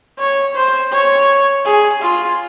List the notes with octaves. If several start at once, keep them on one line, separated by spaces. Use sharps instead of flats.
C#5
C5
C#5
G#4
F4